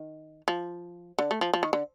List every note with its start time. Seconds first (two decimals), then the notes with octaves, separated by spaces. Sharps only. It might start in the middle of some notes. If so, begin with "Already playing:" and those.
Already playing: D#3
0.48 F3
1.18 D3
1.31 A3
1.41 F3
1.53 F3
1.63 D#3
1.73 D3